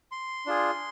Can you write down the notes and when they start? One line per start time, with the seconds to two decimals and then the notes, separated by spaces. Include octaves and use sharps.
0.12 C6
0.46 D4 F4 G#4